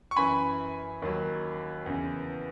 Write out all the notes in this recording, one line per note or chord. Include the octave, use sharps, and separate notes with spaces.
C#6
F#2 E3 G#5 B5
D#2 D#3 F#3
E2 C#3 E3